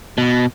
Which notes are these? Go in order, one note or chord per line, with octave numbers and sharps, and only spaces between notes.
B2